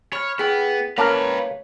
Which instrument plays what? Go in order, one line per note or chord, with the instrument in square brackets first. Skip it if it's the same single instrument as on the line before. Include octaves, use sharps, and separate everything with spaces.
[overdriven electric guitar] C#5 [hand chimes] B5 F6
[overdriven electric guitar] B3 [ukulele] E4 G5 [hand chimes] G#4
[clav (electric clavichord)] A#3 A#4 [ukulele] C#4 E4 A5 [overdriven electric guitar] B4 F5 [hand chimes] C#5